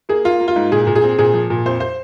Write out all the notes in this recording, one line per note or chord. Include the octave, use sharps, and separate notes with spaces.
A#3 G#4
A#3 F4
A#3
F4
G#2
A#2 G#4
A#2
G#4
C4
A#2 G#4
F3
A#2
F2 C5
C5